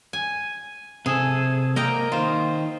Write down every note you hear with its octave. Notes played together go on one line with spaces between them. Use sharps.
G#5
C3 G#4 A4
A#3 A#4 D#5 G5
D#3 F4 C5